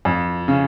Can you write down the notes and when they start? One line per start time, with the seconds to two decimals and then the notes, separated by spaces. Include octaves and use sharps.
0.05 F2
0.48 C#3